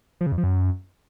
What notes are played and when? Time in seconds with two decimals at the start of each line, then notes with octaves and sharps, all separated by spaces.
0.21 F3
0.26 C#3
0.32 F2
0.38 F3
0.44 F#2